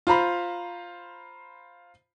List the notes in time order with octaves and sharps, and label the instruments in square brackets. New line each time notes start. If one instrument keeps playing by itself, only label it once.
[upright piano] F4 C5 A#5 B5